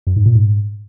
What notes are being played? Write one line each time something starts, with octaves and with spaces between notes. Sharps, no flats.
F#2
G#2
A#2
G#2